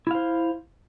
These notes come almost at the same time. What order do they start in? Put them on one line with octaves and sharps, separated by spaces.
E4 F5 C5